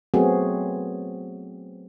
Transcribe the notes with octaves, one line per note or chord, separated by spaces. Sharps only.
F#3 A3 B3 C4 F#4 G#4